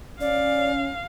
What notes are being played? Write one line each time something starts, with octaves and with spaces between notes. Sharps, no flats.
C#4 D5 F5